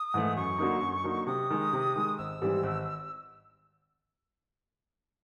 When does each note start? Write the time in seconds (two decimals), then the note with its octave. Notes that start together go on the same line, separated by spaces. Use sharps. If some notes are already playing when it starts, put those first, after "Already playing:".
Already playing: D#6
0.14 G#2 E3 A3
0.36 F#2 C#6
0.58 D3 F#3 A#3 D#4
0.81 F#2
1.04 D3 F#3 A#3 D#4
1.27 C3 D#6
1.50 D#3 G#3
1.73 C3
1.96 D#3 G#3
2.18 G#1 E6
2.42 G#2 E3 G3 C4
2.63 G#1